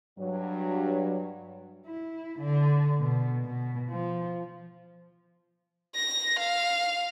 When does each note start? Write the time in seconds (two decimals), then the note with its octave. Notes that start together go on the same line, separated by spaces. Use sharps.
0.18 G2 F#3
1.87 E4
2.39 D3
3.00 B2
3.45 B2
3.91 F3
5.96 A#6
6.40 F5